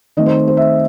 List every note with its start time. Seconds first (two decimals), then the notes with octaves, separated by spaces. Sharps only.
0.17 D#3 A3 C4 D#5
0.26 C5
0.48 C5
0.57 E5